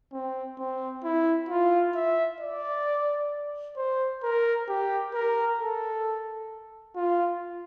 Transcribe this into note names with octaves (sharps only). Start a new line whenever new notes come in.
C4
C4
E4
F4
E5
D5
C5
A#4
G4
A#4
A4
F4